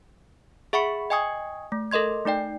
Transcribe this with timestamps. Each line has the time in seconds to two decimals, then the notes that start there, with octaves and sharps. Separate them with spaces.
0.73 G#4 E5 F#5 B5 C#6 C#7
1.10 D#5 G5 G#5 C#6 D#6 G#6
1.72 A3
1.91 A4 A#4 D#5 C6 G#6
2.25 A3 D#4 D5 G5